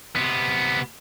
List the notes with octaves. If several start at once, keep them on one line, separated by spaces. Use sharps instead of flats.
C3 B3